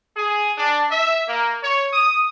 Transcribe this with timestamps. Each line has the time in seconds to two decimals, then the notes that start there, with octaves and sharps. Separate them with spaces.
0.16 G#4
0.57 D4
0.91 E5
1.27 A#3
1.61 C#5
1.93 D#6